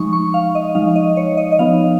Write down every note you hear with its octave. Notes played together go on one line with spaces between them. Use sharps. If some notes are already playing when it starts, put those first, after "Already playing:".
Already playing: F3 G#3 D#4 C#6
C#6
F5
D#5
F3 G#3 D#4 F5
D#5
C#5
D#5
D#5
F3 B3 D#4 F5